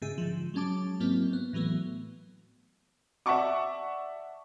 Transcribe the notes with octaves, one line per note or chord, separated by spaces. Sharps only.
G#2 C#3 G#4 E5
G#2 D3 F3
F#3 G#3 C#4 A5 D6
G#2 F#3 A#3 C4 E4
B3
A2 E3 F#3 A3 B3
D5 E5 F#5 A5 C#6 D6